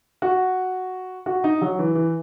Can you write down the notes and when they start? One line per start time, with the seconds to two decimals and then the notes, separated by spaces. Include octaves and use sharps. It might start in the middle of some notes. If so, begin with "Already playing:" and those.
0.22 F#4
1.26 F#4
1.44 D#4
1.61 F#3
1.79 E3
1.95 E3